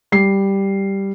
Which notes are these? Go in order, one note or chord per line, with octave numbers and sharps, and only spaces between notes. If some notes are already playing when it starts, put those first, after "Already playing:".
G3 C7